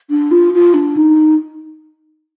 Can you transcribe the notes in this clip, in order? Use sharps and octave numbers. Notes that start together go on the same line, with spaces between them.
D4
F4
F4
D4
D#4